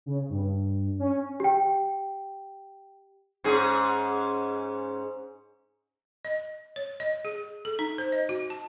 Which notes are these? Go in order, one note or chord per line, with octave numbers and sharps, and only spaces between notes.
C#3
G2
C#4
G4 G5
G#2 C#4 G#4
D#5
C#5
D#5
G#4
A4
D#4
C5
D#5
F#4
A5